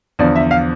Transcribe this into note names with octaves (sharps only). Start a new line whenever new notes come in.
E2 D3 F3 D5
E5
F5